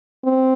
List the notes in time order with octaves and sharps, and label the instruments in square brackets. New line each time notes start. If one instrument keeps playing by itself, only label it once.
[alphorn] C4